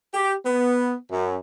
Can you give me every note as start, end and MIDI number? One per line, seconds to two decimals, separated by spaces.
0.14 0.34 67
0.45 0.96 59
1.10 1.36 42